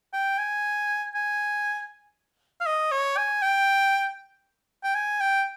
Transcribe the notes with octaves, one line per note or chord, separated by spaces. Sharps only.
G5
G#5
G#5
F5
D#5
C#5
G#5
G5
G5
G#5
G5